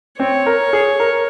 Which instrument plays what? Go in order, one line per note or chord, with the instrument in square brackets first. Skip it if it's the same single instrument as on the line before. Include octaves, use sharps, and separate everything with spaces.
[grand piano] C4 [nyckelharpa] C#5
[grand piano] A#4
G#4
A#4